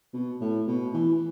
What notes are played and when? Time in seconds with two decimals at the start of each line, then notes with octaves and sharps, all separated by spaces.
0.14 B2
0.41 A2
0.67 B2
0.94 E3